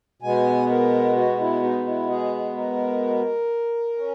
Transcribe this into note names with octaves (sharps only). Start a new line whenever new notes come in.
B2 G#3 B3 G#5
A#4
F#4
E4
D#4
E4
G#4
A#4
C#4